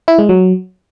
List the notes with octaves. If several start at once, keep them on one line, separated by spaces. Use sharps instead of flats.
E4
G#3
F#3